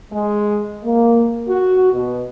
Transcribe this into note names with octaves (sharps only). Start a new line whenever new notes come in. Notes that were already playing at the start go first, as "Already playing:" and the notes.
G#3
A#3
F#4
B2